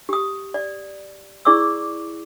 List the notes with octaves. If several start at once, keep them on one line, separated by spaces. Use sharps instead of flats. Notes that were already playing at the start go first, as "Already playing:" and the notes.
G4 D#6
D5
E4 G#4 D5 C#6 D6 E6